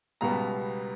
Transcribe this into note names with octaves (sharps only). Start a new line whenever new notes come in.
C#2 B2 G3 B3 A#5